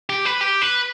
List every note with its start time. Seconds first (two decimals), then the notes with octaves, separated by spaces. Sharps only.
0.10 G4
0.25 B4
0.41 G4
0.62 B4